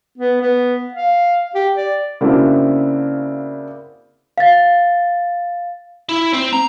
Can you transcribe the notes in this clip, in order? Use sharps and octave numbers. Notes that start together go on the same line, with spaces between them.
B3
B3
F5
G4
D5
C#3 A#3 C4 D4 E4 F#4
F5 A6
E4
C4
A#5